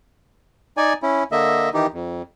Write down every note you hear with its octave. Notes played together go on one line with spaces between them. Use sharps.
D#4 D5 G#5
C#4 E4
D3 A#3 D#5 E5
D#3 E3 D#4 G4
F2